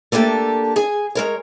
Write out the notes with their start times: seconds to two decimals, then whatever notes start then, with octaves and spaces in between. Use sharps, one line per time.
0.12 A3 A#3 D4 G4 A4
0.76 G#4 G#5
1.15 G#3 A#4 C#5